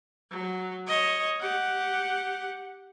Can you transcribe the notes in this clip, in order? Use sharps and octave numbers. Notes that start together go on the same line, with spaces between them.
F#3
C#5 D#5
G4 F#5